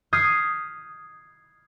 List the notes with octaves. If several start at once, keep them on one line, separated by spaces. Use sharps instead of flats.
D#6 F6 G6 G#6 B6 C7